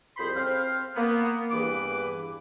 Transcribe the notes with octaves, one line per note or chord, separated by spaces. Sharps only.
C2 F2 G#4 C5 B5 C6
C4 C5 F5
A#3 B3
E2 G2 E3 B4 D6